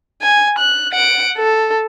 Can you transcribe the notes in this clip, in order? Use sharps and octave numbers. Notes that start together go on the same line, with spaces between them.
G#5
F#6
F#5 D7
A4